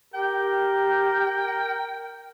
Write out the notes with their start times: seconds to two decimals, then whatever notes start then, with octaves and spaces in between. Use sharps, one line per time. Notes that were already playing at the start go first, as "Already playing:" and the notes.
0.14 G4 A#4 G5